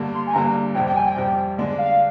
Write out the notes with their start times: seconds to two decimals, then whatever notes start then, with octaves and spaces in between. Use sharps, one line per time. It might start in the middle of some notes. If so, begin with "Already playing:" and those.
Already playing: G2 D3 G3 A#3
0.14 C6
0.27 G#5
0.34 G2 D3 G3 A#3 A#5
0.75 F2 C3 G3 G5
0.86 G5
0.96 G#5
1.07 G5
1.16 F2 C3 G3
1.58 D3 G#3 D4
1.78 F5